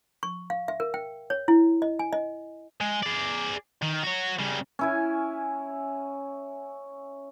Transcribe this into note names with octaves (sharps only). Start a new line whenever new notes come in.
C#6
F5
E5
A#4
G5
C#5
E4
D#5
G#5
D#5
G#3
G#4 D5
D#3
F#4 C#5
C#3 G3
C#4 E4 G#5